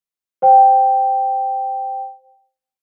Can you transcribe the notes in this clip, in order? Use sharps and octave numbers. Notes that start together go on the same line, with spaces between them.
C5 G5